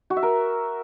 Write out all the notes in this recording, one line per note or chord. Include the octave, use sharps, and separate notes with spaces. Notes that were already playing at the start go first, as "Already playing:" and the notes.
F#4
E5
A#4